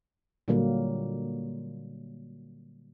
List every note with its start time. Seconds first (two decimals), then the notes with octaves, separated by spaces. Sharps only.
0.48 A#2 D3 F#3 G3 A#3